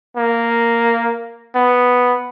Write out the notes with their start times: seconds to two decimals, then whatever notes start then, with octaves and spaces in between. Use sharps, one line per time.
0.17 A#3
1.55 B3